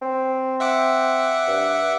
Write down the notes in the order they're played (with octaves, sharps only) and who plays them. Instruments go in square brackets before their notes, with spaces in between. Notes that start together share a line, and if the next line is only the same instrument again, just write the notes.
[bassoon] C4
[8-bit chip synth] E5 F#5 D6
[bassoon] G2